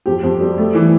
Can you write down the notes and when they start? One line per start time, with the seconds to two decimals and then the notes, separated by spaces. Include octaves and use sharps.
0.06 F2 G4
0.23 F2
0.41 G3
0.58 A3
0.75 E3